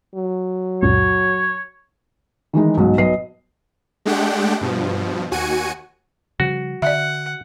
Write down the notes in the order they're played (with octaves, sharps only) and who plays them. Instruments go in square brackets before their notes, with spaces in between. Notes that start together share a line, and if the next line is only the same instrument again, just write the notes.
[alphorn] F#3
[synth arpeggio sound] C#2 F#2 A#2 [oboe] C#5
[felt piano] D#3 E3 G#3 D#4
B1 G#2 B2
B1 B4 D#5 C7
[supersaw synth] G#3 A3 D4 G4 F#5 G5
G2 B2 F3
D#2 F#4 G#5 C#7 D#7
[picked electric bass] C#3 F3 G3 [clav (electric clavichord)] F#4
[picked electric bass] D3 [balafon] D5 E5 [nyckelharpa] F#5